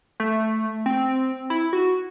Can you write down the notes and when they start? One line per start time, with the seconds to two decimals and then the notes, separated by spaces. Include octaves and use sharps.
0.20 A3
0.86 C4
1.50 E4
1.73 F#4